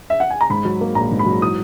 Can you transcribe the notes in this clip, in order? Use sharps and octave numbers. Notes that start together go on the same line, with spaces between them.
E5
F#5
G#5
A#5
G#2 B5
F#3
A#3
A#1 A#5
G#2
B5
F#3
E3 D#6